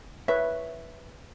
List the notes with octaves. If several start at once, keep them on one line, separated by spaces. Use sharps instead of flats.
B4 C#5 E5